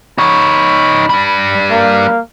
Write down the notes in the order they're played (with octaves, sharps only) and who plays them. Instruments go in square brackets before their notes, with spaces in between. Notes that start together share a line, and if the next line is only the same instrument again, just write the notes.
[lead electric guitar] D#4 C#5 [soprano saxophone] B5
[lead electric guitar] G3 D4
[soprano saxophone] A#3